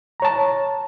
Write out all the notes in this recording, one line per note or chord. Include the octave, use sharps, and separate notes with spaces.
C#5 A5 A#5